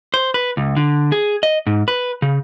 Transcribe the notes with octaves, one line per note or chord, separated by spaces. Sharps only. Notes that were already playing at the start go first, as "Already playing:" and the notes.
C5
B4
C#2
D3
G#4
D#5
G#2
B4
C#3